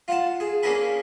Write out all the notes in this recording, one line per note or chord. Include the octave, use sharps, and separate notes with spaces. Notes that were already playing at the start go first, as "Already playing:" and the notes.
F4 F#5 A5
G#4
A#3 C#4 D4 G#4 A#4 B4